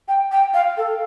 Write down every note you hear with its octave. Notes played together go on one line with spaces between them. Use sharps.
G5
G5
F5
A4